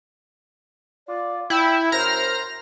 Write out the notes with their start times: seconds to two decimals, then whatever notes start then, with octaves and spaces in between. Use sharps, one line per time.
1.08 F4 D5
1.50 E4 E5 G5
1.92 F#2 A#4 C5 A#5 F6 A#6